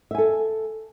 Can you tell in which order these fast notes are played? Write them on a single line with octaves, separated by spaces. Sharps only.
E5 G#5 A4